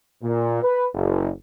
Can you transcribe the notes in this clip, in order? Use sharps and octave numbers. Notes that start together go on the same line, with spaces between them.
A#2
B4
F#1